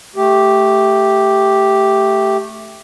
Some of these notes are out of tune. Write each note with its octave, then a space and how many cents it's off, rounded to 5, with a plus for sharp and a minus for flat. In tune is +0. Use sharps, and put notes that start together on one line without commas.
A3 +0 G4 +0